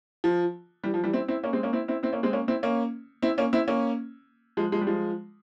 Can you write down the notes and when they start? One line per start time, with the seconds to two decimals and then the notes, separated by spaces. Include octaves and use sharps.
0.24 F3
0.84 E3 G3
0.94 F3
1.04 E3 G3
1.13 C4 E4
1.28 C4 E4
1.43 A#3 C#4
1.53 G#3 C4
1.63 A#3 C#4
1.73 C4 E4
1.88 C4 E4
2.03 C4 E4
2.13 A#3 C#4
2.23 G#3 C4
2.33 A#3 C#4
2.48 C4 E4
2.63 A#3 C#4
3.22 C4 E4
3.38 A#3 C#4
3.53 C4 E4
3.68 A#3 C#4
4.57 F3 G#3
4.72 F3 G#3
4.81 G3
4.87 F3 G#3